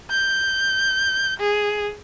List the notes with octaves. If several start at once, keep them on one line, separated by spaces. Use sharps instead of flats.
G6
G#4